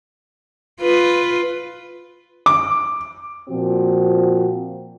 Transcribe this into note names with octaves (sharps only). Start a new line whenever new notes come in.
F4 B4
D6
A#2 F3 C4 F#4